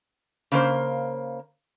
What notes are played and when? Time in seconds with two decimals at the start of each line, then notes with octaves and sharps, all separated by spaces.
0.52 C#3 A#3 C5